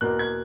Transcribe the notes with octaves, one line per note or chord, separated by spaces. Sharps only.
E2 B2 A#3 F#6
G#6